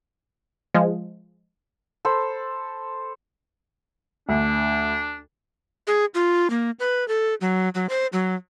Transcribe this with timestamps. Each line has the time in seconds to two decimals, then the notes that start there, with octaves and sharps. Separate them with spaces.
0.74 F3 G#3
2.05 A4 C5 B5
4.29 D2 D4
5.87 G#4
6.15 F4
6.50 A#3
6.80 B4
7.08 A4
7.41 F#3
7.75 F#3
7.89 C5
8.13 F#3